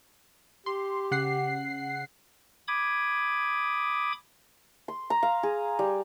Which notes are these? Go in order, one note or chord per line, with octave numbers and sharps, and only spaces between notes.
G4 C6
C#3 F#5 C7
B5 D6 D#6 G#6
C6
A#5
F5
G#4
G3